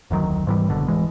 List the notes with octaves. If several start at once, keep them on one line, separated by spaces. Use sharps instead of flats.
F1 D2 D#3 F#3
G#2 E3 G3
F#1 B2 D3
D1 E3 G#3